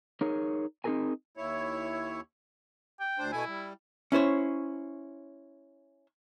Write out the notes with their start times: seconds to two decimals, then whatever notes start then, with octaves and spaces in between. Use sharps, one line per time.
0.21 D#4 G#4 A#4 C#5
0.84 C4 D#4 F#4 G#4 A#4 G#5
1.37 D#2 E4 C#5
3.00 G5
3.19 D2 D4 C5
3.32 B2 A3 E4 G#5
3.47 G3
4.12 C#4 E4 C5 C#5